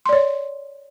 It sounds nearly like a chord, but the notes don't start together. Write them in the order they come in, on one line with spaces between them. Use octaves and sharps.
C6 D5 C#5